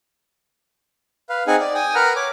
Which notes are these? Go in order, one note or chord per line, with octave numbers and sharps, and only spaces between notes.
B4 F5
C4 D#4 G#4 F#5 G#5
D5
G5 G#5 D#6
A#4 B4 F#5 A#5 F6
C#5 D6